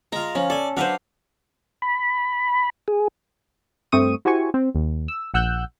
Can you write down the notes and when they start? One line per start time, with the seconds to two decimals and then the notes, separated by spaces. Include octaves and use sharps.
0.12 G#3 F4 A#5
0.35 F3 C#4
0.50 A4 D5 G#5
0.77 F#3 D4 B4 C5 F5
1.82 B5
2.88 G#4
3.92 G2 A3 C4 C#6 D#6 D#7
4.25 E4 F#4 G4 C5 G#5 C#6
4.54 C4
4.75 D#2
5.08 E6
5.34 A#1 F#5 E6 F#6 G6